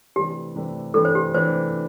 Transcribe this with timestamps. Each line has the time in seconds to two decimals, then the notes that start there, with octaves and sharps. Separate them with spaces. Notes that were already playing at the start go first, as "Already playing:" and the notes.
0.16 C3 E3 A3 D4 G4
0.56 C3 E3 A3 D4
0.94 C3 E3 A3 D4 A4
1.05 C5
1.15 G4
1.34 C3 E3 A3 D4 C5